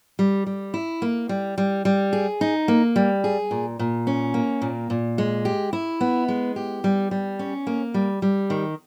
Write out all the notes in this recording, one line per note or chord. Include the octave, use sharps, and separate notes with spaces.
G3
G3
E4
A#3
G3
G3
G3
G#4
D#4
A#3
G3
G#4
A#2
A#2
C#4
A#3
A#2
A#2
G#3
G4
E4
B3
G#3
G4
G3
G3
C#4
A#3
G3
G3
D#3